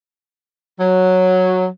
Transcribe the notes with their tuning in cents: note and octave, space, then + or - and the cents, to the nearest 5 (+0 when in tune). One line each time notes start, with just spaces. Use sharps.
F#3 -5